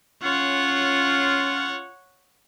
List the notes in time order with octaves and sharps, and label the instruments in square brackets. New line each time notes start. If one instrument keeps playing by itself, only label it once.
[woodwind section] C#4 F4 [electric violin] C#5 F#5